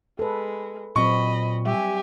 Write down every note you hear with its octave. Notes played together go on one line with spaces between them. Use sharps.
G#3 A4 B4
A#2 F#3 C4 D#5 B5 C#6
G3 G4 E5 G#5